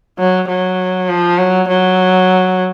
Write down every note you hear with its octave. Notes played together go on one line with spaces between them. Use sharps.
F#3
F#3
F3
F#3
F#3